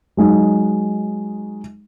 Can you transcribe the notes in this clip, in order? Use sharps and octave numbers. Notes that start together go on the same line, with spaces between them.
F#3 G#3 D#4